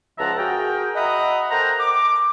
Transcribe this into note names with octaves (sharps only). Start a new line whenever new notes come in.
C#2 F3 E5 F#5 A5 A#5
F#4 G#4 A#4 G5
D#5 E5 F#5 A#5 B5 D#6
A4 A#4 C5 F#5 G5 A#5
D6